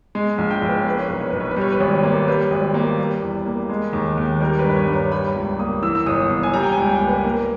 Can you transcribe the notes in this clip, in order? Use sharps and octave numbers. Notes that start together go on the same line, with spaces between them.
G#3
A#1
G5
A#1
B4
C#5
A#3 B4
C#5
B1 B4
C#5
B1 B4
C#5
B4
G3
C#5
B4
G#1
A#3
G3 B4
G#1
A#3
G3
E2
A#3
G#3
D#2
D#2
G3 A#4
B4
G2
B4
C#5
G2
A#5
G3 B5
C#2
A#3 D#6
E3 E6
E6
G1 D#6
G1
G#5
G3 A#5
G5
G#5
C#2
G5
A#3
B4
A#3 A#4